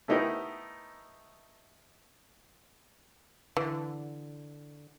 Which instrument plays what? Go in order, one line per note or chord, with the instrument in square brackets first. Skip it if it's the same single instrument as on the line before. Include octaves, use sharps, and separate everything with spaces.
[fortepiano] A3 B3 D#4 E4 G4 A#4
[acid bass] D3 [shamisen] E3